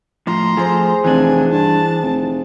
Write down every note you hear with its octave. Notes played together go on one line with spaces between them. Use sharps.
A2 F3 A#5 C6
F3 A3 G#4 C5
F1 E3 D4 G#5
G2 A5
F1